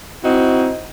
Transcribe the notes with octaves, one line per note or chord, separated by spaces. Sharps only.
C4 D#4 E4 F#4